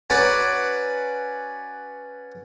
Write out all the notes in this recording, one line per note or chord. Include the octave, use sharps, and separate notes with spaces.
C#4 F#4 B4 D5 A#5